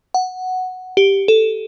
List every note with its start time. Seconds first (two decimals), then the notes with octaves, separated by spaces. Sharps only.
0.14 F#5
0.97 G4
1.28 A4